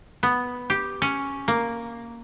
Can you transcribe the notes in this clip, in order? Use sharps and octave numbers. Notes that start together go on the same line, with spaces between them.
B3
G4
C#4
A#3